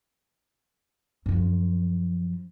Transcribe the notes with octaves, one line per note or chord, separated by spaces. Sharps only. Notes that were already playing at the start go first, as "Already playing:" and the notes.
F#2 F3